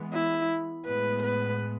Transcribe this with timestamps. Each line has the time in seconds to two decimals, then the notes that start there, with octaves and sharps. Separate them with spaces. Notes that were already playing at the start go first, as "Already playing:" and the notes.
Already playing: E3 G#3 B3
0.13 E4
0.86 A2 G#3 B3 B4
1.22 B4